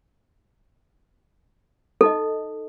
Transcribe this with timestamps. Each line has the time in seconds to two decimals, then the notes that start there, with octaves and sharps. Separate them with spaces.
2.01 A4
2.03 D#4
2.06 D#5